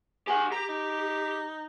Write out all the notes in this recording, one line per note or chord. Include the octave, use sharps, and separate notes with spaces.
G4 G#4 F#5
G4 A#5
D#4